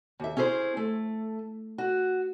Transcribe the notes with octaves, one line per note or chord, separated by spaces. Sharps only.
D#2 E5
C#4 E4 G#4 B4 C5
A3
F#4